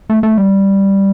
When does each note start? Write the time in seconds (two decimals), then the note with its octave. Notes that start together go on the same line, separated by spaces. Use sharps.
0.10 A3
0.23 A3
0.38 G3